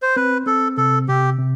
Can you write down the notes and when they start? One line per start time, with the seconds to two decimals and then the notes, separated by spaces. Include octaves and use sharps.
0.02 C5
0.16 C4 B4
0.46 C4 A4
0.77 C3 A4
1.08 C3 G4
1.39 C3